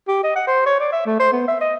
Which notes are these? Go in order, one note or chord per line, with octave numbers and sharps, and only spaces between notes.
G4
D#5
F#5
C5
C#5
D5
E5
A3
C5
B3
E5
D#5